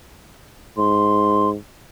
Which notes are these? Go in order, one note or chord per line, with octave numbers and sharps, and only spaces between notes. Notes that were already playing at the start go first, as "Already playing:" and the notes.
G#2 C6